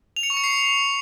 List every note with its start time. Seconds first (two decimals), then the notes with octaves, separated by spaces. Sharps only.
0.16 F7
0.23 C#7
0.30 C#6
0.37 C#7
0.44 C7